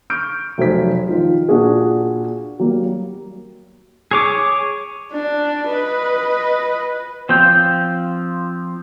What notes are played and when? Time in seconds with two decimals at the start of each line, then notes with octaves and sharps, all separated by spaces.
0.10 C#6 F6 G6 D7
0.58 F1 F#3 C5 B6
1.08 D#3 F3 F4
1.49 A#2 D4 F#4 G#4
2.59 F#3 G3 A#3
4.11 G#4 C#5 D6
5.12 D4
5.68 B4 D#5
7.29 F3 C4 F4 G5